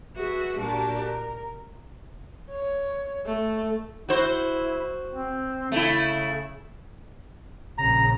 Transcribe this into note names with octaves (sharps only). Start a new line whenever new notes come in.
F#4 G#4 B4 E5
A#2 D4 F#4 G4 A#4
A#4
C#5
A3
E4 F#4 C5
C4
C#3 A3 E4
A#1 C#3 A#5